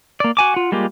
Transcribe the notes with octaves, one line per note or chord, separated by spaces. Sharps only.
A#3 D5
F#4 G#5 D6
F4 F#5
G3 G#3 A#3 F4 G4